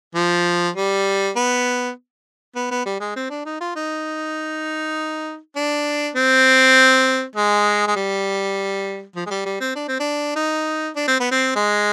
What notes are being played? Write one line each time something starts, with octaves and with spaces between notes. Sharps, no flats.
F3
G3
B3
B3
B3
G3
G#3
C4
D4
D#4
F4
D#4
D4
C4
G#3
G#3
G3
F3
G#3
G3
G3
C4
D4
C4
D4
D#4
D4
C4
B3
C4
G#3